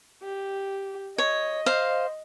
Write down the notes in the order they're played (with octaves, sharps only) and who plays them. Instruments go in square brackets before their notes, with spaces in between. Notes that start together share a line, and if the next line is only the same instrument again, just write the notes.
[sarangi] G4
[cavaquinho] C#5 [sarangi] D#5
[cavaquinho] C5 F5